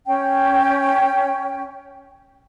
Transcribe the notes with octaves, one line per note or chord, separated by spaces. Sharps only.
C#4 G5